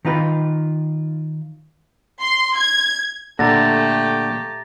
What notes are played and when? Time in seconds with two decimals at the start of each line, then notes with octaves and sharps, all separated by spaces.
0.05 D#3 D#4 F4 B4
2.22 C6
2.58 G#6
3.39 A#2 D3 A3 G4 A#5 A6 A#6